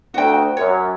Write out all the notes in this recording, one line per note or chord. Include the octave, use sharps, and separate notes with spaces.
D2 F#4 G5
F#2 C#5